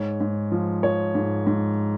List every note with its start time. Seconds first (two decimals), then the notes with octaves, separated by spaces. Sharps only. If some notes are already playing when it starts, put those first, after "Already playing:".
Already playing: G#2 C#5
0.21 G#2
0.52 F3
0.83 F3 C#5
1.15 G#2
1.47 G#2